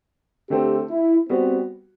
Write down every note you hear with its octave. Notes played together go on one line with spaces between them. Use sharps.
D3 A3 C4 G4
E4
G3 B3 C4 F#4